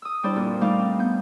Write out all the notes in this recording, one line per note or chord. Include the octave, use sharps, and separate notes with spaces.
D#6 E6
G3 D4 E4 C5 D5
F2 A#2
G3 A3 D4 D#4 F5 D6
C4
B3 G6